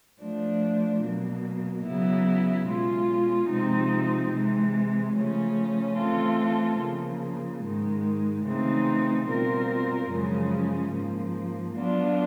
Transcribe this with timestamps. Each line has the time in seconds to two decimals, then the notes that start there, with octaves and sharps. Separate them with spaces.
0.20 F3 A3 D4
1.03 B2 F#3 A#3
1.85 C#3 F#3 B3 E4
2.67 B2 G#3 C#4 F4
3.49 C3 F3 G#3 C4 D#4
4.32 C3 E3 G#3
5.15 C#3 F3 A3 C#4
5.96 E3 A3 C4 F4 A4
6.79 C#3 F3 A#3
7.62 G#2 D#3 G#3
8.44 C#3 E3 A3 C4 D#4
9.26 B2 G3 C4 F4 A#4
10.09 F#2 C#3 F3 G#3 C#4
10.91 G#2 F3 A#3
11.74 F#3 B3 D4 F4